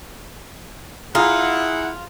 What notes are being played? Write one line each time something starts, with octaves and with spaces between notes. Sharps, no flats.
E4 F4 G#4 F#5 A#5